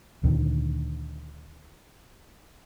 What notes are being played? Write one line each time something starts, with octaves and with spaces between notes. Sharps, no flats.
D2 A#2 D3 D#3